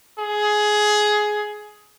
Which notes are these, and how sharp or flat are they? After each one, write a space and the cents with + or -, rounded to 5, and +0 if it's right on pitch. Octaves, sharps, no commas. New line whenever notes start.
G#4 +15